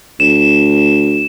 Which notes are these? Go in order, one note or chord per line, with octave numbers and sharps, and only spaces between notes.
D2 E7